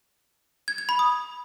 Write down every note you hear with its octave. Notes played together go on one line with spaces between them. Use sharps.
G#6
G#6
B5
D#6